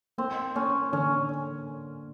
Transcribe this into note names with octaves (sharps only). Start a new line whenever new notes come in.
A#3 C4
A#3 C#4
D3 C#4